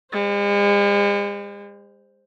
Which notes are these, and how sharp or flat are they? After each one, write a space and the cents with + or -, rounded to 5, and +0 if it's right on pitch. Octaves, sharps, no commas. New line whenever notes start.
G#3 -45 C5 +0